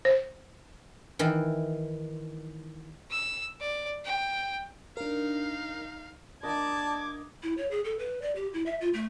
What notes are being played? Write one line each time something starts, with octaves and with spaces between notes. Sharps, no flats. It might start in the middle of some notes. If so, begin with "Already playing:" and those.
C5
D#3 E3
E6
D5
G5
D4 D#4 A#4 F5
A#3 D4 D5 D#5 A5 D6 G#6
E4
C#5
G#4
A4
B4
D5
G4
E4
E5
F4
A3